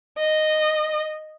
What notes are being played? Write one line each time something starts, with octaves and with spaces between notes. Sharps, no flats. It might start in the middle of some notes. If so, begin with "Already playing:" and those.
D#5